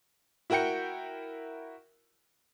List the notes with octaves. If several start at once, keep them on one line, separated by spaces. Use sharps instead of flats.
E4 F#4 A#4 G5 G6 C#7